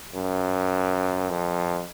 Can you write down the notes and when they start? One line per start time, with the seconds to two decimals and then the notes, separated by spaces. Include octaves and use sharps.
0.14 F#2
1.30 F2